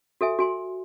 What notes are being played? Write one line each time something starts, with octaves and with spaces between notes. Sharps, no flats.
F#4 A4 E5 G#5
F#4 G#5 C6